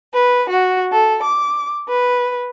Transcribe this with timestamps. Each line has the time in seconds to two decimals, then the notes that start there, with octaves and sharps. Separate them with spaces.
0.13 B4
0.49 F#4
0.92 A4
1.23 D6
1.89 B4